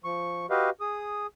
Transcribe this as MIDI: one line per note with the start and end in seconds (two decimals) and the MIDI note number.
0.04 0.46 53
0.04 0.46 85
0.50 0.70 66
0.50 0.70 67
0.50 0.70 71
0.50 0.70 75
0.50 0.70 77
0.81 1.27 68
0.81 1.27 87